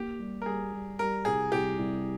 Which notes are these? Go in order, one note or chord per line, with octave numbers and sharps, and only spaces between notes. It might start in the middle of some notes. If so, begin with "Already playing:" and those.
Already playing: A#3 G4
G3
A#4
G3 G#4
G3
G3 A#4
C2 G#4
C2 G4
C2